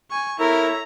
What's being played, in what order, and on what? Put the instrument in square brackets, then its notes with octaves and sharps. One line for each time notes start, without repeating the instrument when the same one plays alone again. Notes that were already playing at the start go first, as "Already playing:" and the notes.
[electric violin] G#5 C#6
[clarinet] E4 [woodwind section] A4 C#5 E5 [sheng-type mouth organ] A#4 [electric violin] A#5